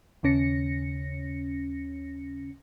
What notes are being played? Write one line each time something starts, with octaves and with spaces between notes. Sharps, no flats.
D#2 C#3 C#4 A#6 C#7